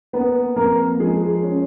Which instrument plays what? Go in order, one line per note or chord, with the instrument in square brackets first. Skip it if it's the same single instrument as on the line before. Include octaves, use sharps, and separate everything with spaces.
[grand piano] A#3 B3 B4
F2 A#3 A#4
F3 G#3 G#4
C#4